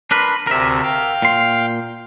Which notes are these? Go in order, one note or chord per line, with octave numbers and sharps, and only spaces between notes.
D4 A#4 B4 B5 C6
D2 C3 A#4 E5
F5 G5
A#2 C6